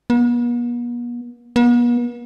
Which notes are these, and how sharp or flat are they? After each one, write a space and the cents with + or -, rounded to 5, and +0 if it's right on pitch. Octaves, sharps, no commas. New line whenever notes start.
B3 -45
B3 -45